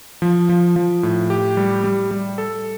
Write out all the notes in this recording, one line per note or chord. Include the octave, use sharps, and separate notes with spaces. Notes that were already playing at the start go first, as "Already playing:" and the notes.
F3
F3
F3
A2
G4
G3
G3
G3
A4